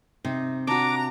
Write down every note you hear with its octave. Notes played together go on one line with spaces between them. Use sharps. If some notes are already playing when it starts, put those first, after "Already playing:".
C3 D#4
D4 F#4 A#5 D6